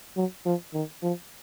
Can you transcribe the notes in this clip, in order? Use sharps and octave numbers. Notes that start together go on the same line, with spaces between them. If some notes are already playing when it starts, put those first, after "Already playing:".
F#3
F3
D#3
F3